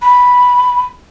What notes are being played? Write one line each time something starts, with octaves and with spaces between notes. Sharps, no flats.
B5